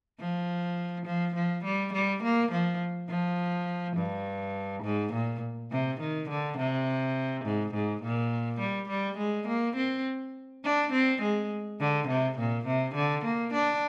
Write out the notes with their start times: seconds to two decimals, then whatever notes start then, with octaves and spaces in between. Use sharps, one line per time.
0.20 F3
1.06 F3
1.35 F3
1.64 G3
1.93 G3
2.23 A#3
2.52 F3
3.09 F3
3.97 G2
4.83 G#2
5.13 A#2
5.71 C3
6.00 D#3
6.29 D3
6.58 C3
7.45 G#2
7.74 G#2
8.03 A#2
8.60 G3
8.89 G3
9.18 G#3
9.48 A#3
9.76 C4
10.64 D4
10.92 C4
11.22 G#3
11.80 D3
12.08 C3
12.38 A#2
12.67 C3
12.95 D3
13.25 A#3
13.53 D4